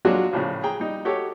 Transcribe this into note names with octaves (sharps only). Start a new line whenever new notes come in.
F#3 G#3 D4 F4 F#4
A#1 A2 C#3
G#4 G5 A#5
G3 D#4
F#4 G4 A4 C#5